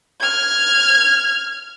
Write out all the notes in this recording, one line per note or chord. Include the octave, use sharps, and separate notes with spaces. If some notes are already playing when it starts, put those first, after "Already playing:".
F6 G#6